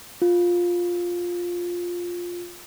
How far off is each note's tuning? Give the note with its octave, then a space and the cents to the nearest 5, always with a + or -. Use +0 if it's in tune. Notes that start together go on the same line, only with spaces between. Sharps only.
F4 +10